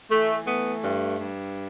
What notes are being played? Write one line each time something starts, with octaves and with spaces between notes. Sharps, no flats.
E3 A3
A3 B3
G2
G2